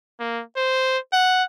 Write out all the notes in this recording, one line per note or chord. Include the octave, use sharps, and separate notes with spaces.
A#3
C5
F#5